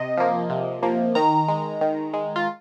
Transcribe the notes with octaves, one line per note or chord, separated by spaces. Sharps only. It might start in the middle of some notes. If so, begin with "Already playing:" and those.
Already playing: C3 D#5
F3 A#3
C3
F3 A#3
D#3 A#5
G#3
D#3
G#3
F4